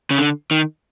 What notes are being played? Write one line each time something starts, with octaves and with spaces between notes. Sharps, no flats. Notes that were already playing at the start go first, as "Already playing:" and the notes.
C#3
D3
D#3